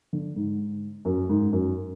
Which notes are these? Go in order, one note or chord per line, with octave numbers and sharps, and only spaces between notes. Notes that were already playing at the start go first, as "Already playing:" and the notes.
D3
G#2
F#2
G#2
F#2